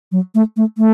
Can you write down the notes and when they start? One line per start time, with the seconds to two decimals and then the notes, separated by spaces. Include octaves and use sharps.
0.12 F#3
0.35 A3
0.57 A3
0.78 A3